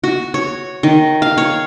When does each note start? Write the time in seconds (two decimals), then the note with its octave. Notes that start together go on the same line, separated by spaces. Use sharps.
0.04 F#4
0.34 C#5
0.83 D#3
1.22 F5
1.38 C#5